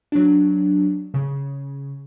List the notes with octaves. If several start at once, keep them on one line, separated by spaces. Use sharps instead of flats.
F#3 D4
C#3